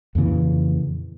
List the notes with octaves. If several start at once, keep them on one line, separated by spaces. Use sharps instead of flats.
F2 A#2 C#3 E3